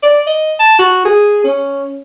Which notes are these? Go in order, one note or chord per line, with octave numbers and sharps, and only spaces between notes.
D5
D#5
A5
F#4
G#4
C#4